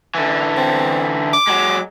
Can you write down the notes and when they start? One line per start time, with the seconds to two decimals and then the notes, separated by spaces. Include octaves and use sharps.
0.15 D3 E3
0.57 C4
1.33 D6
1.47 F#3 G#3